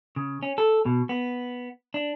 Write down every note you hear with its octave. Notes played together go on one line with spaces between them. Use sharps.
C#3
C#4
A4
B2
B3
D4